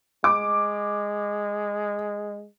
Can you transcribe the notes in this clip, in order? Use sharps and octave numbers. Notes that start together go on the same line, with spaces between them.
G#3 D6